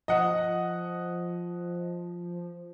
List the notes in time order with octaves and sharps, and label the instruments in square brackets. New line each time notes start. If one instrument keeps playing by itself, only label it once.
[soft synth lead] F3 [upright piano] D#5 F#5